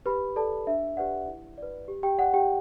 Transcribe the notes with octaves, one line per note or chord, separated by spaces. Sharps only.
G4 B4 B5
A4 D5 A5
D4 E5
G4 B4 D5 F#5
E4
B4 D5
G4
G4 G5
D5 F#5
G4 G5